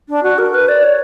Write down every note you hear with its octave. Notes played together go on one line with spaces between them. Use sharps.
D4
F#4
A#4
B4
D5
C#5